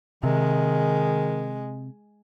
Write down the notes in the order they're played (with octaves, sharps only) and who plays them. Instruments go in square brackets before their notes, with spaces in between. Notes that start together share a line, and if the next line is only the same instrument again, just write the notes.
[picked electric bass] C3 [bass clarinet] D#3 [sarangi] G#3